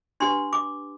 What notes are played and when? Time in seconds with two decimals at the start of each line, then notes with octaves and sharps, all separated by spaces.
0.20 D4 G4 B4 C6
0.53 D6